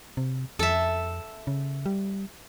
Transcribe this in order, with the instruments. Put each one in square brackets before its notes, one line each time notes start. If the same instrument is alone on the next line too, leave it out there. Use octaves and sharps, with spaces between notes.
[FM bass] C3
[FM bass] F2 [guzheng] A4 E5
[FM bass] C#3
G3